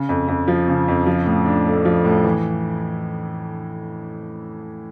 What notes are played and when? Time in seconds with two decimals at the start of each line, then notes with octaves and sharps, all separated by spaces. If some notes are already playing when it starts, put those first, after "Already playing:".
Already playing: C#3
0.09 F2
0.28 F2
0.48 F3
0.68 C#3
0.88 F2
1.07 F3
1.26 A2
1.46 D4
1.66 A3
1.85 F3
2.05 A2
2.24 E3